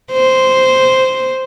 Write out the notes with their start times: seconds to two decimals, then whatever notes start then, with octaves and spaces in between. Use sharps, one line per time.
0.12 C5